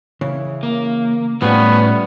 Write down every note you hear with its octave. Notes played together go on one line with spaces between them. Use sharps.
C#3 E3
A#3
A2 F3 G3 B3 C#4